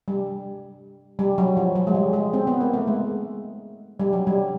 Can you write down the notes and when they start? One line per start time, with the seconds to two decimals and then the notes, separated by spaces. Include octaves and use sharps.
0.08 G3
1.19 G3
1.38 F#3
1.57 F3
1.75 F#3
1.87 G#3
1.95 G3
2.13 G#3
2.33 C4
2.47 B3
2.61 A#3
2.74 A3
2.87 G#3
4.00 G3
4.13 F#3
4.27 G3